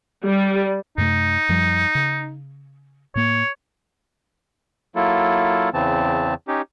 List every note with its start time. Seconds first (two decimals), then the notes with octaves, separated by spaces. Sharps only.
0.24 G3
0.98 F#2 C3 A3 D#4
1.49 F#2 F3 G3
1.95 C#3
3.15 A2 A#3 C#5
4.96 F#3 A#3 E4 F4 A4
5.74 E2 C#3 E3 C4 A5
6.48 C#4 D#4 G4